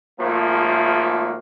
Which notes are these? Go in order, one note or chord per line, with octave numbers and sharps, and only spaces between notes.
G#1 G#2 F3 A3 A#3